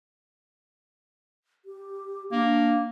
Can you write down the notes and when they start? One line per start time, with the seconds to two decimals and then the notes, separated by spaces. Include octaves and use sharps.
1.65 G4
2.32 A#3 D4